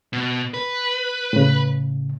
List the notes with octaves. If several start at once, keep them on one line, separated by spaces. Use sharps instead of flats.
B2
B4
A2 C#3